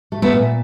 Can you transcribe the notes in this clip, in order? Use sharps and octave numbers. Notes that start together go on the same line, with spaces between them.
A3
A3 B3
A#2